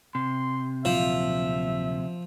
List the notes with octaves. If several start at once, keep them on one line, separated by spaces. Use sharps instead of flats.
C3 C6
D2 A#2 F3 F#3 E5